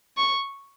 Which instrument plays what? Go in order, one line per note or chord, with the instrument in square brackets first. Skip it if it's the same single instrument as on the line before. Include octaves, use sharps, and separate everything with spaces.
[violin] C#6